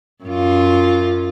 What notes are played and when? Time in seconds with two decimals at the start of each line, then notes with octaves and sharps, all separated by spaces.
0.24 F#2 F4